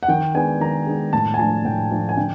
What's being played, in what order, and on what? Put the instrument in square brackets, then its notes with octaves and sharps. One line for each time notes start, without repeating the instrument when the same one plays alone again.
[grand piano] F#5
D#3 G5
G#3 B3 D4 G#5
D#3 A#5
G#3 B3 D4
A2 A5
G#5
F3 A3 D4 A5
A2 G5
F3 A3 D4
G#5
D3 G5